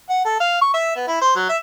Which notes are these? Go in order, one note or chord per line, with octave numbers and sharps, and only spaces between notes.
F#5
A4
F5
C#6
E5
B3
E4
C5
F#3
E5